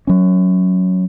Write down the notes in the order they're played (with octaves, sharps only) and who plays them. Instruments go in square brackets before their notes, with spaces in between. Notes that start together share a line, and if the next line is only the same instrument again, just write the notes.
[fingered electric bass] F#3 C#4